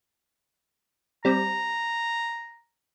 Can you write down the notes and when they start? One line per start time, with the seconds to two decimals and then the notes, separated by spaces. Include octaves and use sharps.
1.25 G3 C4 A#5